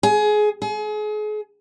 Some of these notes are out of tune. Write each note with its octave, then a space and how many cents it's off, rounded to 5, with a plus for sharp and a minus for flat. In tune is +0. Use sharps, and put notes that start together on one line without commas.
G#4 +20
G#4 +35